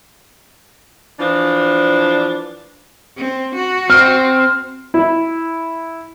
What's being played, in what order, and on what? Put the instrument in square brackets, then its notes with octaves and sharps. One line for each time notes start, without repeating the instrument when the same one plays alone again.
[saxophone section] E3 F3 D4
[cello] C4
F#4
[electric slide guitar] C4 [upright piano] F6
[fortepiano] E4